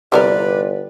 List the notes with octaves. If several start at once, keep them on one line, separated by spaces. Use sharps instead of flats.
G1 C3 E3 G3 A#4 B4 D5